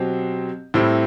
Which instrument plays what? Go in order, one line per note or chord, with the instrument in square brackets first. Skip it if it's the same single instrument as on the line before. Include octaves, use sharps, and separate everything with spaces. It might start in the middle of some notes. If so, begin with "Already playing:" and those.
Already playing: [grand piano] B2 F#3 C4 G4
A2 G3 C4 E4